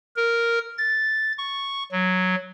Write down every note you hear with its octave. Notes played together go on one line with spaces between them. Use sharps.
A#4
A6
C#6
F#3